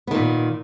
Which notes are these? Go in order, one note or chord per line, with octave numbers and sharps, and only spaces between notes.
A#2 D#3 B3